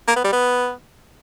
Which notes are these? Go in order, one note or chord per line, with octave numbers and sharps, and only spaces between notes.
A#3
B3
G3
B3